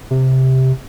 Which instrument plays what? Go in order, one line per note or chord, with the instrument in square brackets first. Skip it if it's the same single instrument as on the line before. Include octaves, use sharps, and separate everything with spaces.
[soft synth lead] C3